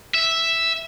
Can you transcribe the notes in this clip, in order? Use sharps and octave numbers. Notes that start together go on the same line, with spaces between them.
E5